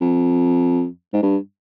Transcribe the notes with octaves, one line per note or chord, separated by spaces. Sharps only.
F2
G#2
G2